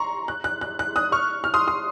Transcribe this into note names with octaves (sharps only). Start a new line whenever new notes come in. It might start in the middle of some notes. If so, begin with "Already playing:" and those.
Already playing: A#5 C6 C#6
F#6
F#6
F#6
F#6
D#6 F#6
C#6 F6
F6
C6 D#6
C6 D#6